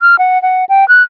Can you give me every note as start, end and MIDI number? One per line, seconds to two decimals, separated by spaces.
0.01 0.18 89
0.19 0.41 78
0.42 0.65 78
0.69 0.87 79
0.88 1.03 90